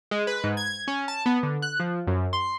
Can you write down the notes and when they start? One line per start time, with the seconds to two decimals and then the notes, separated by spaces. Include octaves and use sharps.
0.11 G#3
0.27 B4
0.44 G#2
0.57 G#6
0.88 C#4
1.08 A5
1.26 B3
1.43 D3
1.62 F#6
1.80 F3
2.07 F#2
2.33 C6